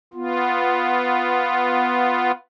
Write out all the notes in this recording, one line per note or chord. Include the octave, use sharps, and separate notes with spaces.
B3 F4